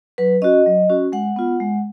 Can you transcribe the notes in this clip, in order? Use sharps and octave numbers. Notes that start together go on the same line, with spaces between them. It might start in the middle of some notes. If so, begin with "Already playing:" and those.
F#3 B4
C#4 F#4 D#5
F#3
C#4 F#4
G#3 F#5
B3 F4
G#3